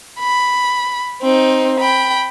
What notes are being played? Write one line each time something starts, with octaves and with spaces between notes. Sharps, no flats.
B5
C4 D#4
G5 B5